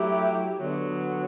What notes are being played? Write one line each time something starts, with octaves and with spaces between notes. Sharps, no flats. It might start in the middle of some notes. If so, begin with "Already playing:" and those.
Already playing: F#3 A3 E4 G4
D3 F#3 B3